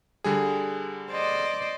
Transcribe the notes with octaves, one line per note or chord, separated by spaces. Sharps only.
D3 G3 G#4
C5 D5 D#5